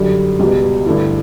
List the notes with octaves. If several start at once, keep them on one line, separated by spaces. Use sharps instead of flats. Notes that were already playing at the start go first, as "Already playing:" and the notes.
Already playing: F#2 D3 G3
C#2 B2 G3
G2 D3 A3 E4